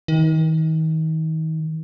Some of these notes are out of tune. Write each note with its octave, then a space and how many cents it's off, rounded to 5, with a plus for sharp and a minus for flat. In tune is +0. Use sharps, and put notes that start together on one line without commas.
D#3 +35